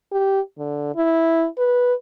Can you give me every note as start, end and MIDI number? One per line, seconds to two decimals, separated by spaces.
0.12 0.40 67
0.58 0.95 50
0.96 1.45 64
1.58 1.93 71